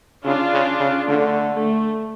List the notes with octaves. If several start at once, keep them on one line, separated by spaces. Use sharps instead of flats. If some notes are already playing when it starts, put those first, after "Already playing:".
C#3 D4 F4
C#3
C#3
D3 A3
A3